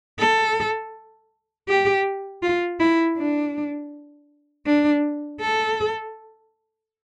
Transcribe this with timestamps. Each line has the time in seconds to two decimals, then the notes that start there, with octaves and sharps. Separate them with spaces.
0.19 A4
1.69 G4
2.43 F4
2.80 E4
3.17 D4
4.66 D4
5.41 A4